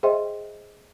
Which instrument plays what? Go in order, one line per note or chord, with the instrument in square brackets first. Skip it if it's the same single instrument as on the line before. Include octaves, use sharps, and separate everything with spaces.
[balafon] G#4 C5 D#5 E5 G5 C6